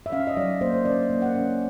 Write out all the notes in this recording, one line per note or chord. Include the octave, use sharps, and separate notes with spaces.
E5
C#4 F5
D#5
F#3 D5
A#3 C5
C#4 D5
A#3
F#5
C#4